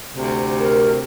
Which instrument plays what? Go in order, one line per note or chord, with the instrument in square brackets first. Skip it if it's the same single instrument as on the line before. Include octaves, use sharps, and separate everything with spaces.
[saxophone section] D2 C3
[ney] A#4